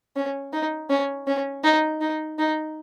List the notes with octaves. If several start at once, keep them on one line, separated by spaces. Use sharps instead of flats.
C#4
D#4
C#4
C#4
D#4
D#4
D#4